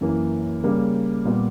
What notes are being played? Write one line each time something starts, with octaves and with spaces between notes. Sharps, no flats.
F#2 E3 A#3
C#3 G3 A#3
A#2 G3 B3